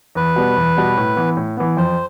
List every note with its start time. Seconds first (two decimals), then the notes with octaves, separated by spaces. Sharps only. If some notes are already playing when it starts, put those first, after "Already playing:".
0.15 E2 B4
0.36 B2 G3 B3
0.57 E2
0.77 B2 G3 B3
0.97 A2
1.16 E3 B3
1.37 A2
1.57 E3 B3
1.77 F2 C5